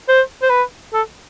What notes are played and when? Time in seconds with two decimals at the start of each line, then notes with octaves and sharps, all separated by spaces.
0.09 C5
0.42 C5
0.50 B4
0.93 A4